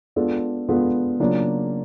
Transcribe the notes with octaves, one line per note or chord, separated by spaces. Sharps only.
G#3 B3 D4 F4 A4
G#3 B3 D4 F4 A4
C#3 F#3 A#3 D4 F4